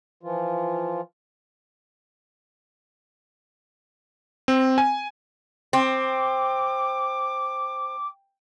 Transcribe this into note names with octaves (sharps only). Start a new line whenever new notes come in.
E3 F3 F4
C4
G#5
C4 D6